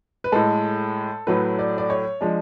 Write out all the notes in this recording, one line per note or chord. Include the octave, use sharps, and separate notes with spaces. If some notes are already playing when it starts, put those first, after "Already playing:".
B4
A2 G#3 A4
A2 F#3 A3 B4
D5
D5
C#5
F3 G#3 D4